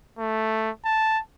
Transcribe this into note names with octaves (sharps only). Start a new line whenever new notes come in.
A3
A5